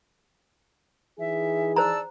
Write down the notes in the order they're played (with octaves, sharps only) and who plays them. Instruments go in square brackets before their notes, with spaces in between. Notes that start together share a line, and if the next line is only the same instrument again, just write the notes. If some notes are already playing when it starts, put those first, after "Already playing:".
[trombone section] E3 D#4 G#4 [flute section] E5
[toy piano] C5 A#5 [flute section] D5 A5 E6